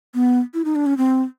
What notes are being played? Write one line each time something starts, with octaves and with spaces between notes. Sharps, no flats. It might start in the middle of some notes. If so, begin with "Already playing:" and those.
B3
E4
D#4
D4
C#4
C4